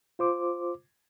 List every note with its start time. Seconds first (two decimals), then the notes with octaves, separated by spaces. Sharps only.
0.19 F4 C5 D6